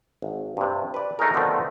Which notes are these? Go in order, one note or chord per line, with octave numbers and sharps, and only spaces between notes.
G#1
G2 C3
B4 D5
A3 D#4 F#4 G#4 A#4
B2 D3 D#3 F3 A3 C4